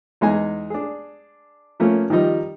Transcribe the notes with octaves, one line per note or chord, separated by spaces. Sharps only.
E2 G#3 D#4 G#5
D4 G#4
F3 A3 A#3 C#4
D#3 F3 G3 D#4